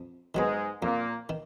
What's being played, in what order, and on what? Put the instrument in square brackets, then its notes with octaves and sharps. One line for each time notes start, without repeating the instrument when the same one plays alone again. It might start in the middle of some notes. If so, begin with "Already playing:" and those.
Already playing: [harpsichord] F2
[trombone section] G#2 G#3 [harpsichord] D#3 F#3 B3
[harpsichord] F2 [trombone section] A#2 A#3
[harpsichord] D#3